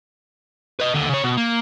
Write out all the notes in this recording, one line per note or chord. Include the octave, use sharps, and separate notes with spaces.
B4 D#5
D#2 D3
C#3 C#5
B2
A#3